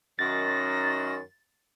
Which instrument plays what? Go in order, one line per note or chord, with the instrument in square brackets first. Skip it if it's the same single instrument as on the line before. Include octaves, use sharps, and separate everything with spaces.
[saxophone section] F#2 D#3 [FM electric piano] A6 [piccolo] A#6